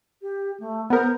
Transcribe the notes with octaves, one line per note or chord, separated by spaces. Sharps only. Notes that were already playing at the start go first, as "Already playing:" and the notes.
G4
A3
B3 A#4 C5